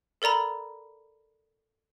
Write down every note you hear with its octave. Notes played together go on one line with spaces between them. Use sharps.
A4 A#4 D5 A#5 B5